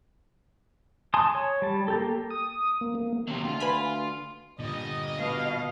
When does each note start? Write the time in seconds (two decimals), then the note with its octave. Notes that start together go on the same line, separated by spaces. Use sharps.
1.14 G#5 A5 C6 D#6
1.35 C#5
1.62 G3 A5
1.88 A#3 G4 A4
2.31 D#6
2.81 A#3
2.95 A#3
3.27 D#2 C3 F#3 C4
3.44 D2 F4
3.60 B4 G#5 B5
4.60 A#2 D3 G3 D#5
5.16 B2 F5